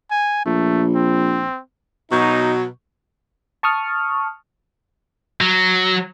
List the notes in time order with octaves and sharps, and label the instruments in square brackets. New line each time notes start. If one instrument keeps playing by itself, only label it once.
[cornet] G#5
[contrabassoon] A#1 [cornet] A3
[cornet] C4
[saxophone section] B2 [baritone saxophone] F#3 [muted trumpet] D#4 [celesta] C#6 G6
[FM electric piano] A5 C#6 D#6 F6
[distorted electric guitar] F#3